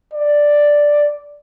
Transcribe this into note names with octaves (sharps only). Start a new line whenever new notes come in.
D5